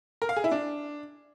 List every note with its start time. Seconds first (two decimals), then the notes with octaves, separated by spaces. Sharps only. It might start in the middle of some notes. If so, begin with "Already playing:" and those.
0.22 A#4
0.29 F5
0.37 G#4
0.44 E4
0.51 D4